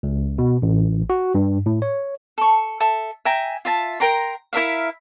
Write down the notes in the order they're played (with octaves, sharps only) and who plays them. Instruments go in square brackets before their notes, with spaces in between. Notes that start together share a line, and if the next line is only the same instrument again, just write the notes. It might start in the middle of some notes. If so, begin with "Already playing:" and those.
[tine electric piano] C#2
B2
A1
F#4
G2
A2
C#5
[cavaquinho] A4 C#6
A4 E5
E5 G5 G#5 A#5
F4 E5 A5
A#4 G5 A#5 C6
E4 A#4 E5 F5